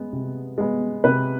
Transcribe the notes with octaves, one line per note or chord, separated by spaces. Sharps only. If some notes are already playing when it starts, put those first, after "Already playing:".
Already playing: G#3 B3
C3
G#3 B3
C3 B4